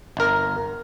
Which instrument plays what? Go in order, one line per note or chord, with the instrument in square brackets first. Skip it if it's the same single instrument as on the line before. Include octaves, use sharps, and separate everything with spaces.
[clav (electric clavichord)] G1 A#4